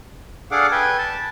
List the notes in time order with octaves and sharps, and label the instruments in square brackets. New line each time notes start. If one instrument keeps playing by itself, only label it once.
[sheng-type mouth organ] D4 G#4 A4 F5 F#5 D6
B4 G5 G#5
A5